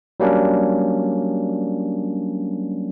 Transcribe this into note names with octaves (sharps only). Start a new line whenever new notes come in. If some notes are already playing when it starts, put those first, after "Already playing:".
F#3 G3 A#3 C#4 D4